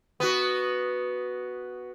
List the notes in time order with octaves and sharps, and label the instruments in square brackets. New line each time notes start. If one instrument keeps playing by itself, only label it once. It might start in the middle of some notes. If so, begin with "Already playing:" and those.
[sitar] B3 F#4